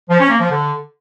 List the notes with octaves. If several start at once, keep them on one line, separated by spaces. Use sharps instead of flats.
F3
C#4
A#3
F3
D3